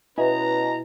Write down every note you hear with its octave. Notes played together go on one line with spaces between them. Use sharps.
B2 C#4 E4 B4 D#5 G#5 A#5